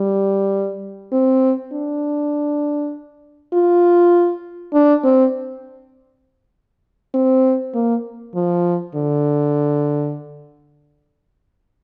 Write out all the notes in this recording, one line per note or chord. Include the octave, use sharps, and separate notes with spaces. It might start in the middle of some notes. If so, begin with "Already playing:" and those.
Already playing: G3
C4
D4
F4
D4
C4
C4
A#3
F3
D3